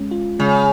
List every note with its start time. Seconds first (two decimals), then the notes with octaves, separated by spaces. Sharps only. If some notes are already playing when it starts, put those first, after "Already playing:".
Already playing: G#3 C#4
0.11 F4
0.39 C#3 G#3